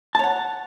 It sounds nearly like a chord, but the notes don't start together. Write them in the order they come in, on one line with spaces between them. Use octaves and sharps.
A5 C#5 F#5